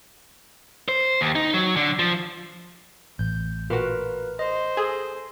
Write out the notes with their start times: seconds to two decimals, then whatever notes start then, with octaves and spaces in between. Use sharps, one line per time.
0.88 C5
1.21 D#2
1.35 D#4
1.54 F#3
1.76 D3
1.99 F3
3.19 A1 G6
3.70 A#2 F4 F#4 A#4 B4
4.39 C5 D#5
4.77 G#4 A4